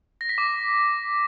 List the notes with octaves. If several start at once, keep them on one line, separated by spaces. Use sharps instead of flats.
A#6
B6
D6